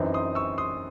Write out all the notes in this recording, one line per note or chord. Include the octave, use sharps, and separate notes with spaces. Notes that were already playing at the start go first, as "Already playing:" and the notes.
Already playing: F#2 E3 C4 D#4
C6 D#6
C#6 E6
C6 D#6